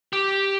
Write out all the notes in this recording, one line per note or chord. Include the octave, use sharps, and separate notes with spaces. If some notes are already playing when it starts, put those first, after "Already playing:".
G4